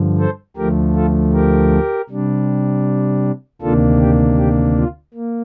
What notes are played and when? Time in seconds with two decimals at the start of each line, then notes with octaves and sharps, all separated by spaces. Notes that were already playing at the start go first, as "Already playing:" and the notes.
Already playing: G2 D3 F3
0.19 A4 C5
0.57 D2 D3 F3 A3 G4 A#4
0.95 F4 A4
1.33 G4 A#4
2.09 C3 G3 D4
3.61 D2 C3 D#3 A#3 D4 F4 A4
4.00 G4
4.38 G4
4.76 F4
5.14 A#3